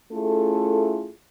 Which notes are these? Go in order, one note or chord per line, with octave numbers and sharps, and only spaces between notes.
A3 C#4 E4 F4 G#4 A4